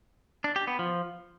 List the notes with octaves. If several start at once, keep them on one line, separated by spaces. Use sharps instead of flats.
D4
G4
B3
F3